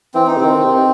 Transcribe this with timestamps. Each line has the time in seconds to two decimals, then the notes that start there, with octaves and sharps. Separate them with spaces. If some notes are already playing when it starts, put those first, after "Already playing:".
0.14 E3 C4
0.27 D#4
0.37 C3
0.41 D#3 C4
0.65 C3